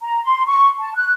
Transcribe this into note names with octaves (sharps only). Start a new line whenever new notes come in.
A#5
C6
C#6
A5
F#6